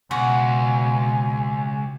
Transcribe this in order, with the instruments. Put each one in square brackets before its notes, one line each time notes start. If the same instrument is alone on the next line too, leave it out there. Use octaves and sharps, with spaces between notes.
[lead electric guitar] C#2 [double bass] B2 [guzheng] F#4 [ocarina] G#5